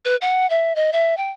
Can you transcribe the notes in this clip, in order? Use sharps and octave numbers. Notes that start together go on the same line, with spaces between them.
B4
F#5
E5
D#5
E5
G5